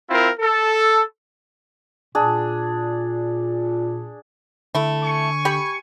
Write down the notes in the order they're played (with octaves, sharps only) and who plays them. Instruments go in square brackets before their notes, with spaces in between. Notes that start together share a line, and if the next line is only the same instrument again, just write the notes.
[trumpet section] C4 E4 F4 A#4
A4
[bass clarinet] A#2 [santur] D4 G#4
[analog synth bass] D3 [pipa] A3 E4
[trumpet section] G#5 C#6
[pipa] G4 B5